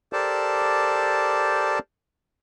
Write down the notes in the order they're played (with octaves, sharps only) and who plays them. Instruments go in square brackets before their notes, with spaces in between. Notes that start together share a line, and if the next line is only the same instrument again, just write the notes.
[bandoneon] G4 A4 A#4 C5 D5 A5